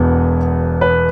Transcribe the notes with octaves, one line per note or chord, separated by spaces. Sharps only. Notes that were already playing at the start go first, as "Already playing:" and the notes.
Already playing: E1 E2 B2 B3
B4